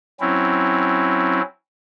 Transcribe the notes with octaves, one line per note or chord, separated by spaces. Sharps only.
F#3 C4 C#4 E4